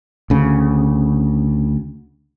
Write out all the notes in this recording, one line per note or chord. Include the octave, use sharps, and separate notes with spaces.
D2 C#3